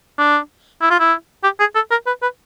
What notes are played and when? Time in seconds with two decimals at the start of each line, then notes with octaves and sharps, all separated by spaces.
0.18 D4
0.81 E4
0.90 F4
0.99 E4
1.43 G4
1.60 G#4
1.75 A4
1.90 A#4
2.07 B4
2.22 B4